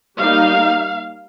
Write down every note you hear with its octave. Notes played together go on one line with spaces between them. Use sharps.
G3 A#3 D#4 F5